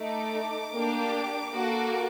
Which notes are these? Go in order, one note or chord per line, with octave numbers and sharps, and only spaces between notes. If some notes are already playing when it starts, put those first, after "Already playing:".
Already playing: A3 D#4 A4 D6
A#3 D4 G4
A#3 F#4 A4